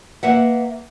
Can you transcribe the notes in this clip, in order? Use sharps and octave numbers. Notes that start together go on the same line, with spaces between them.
A#3 B4 E5 F#5